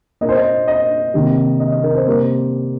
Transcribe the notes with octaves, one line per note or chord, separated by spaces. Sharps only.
A#2 A#3 C5 D#5
D#5
D#5
C3 D#3 A#3
D#5
D#5
A#4
C5
C3 G3 A#3 C5